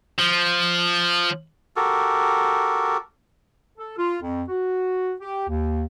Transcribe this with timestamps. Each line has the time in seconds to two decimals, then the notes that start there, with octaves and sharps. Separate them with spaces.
0.19 F3
1.76 F#4 G4 A4 A#4
3.78 A4
3.98 F4
4.22 F2
4.49 F#4
5.20 G4
5.48 D#2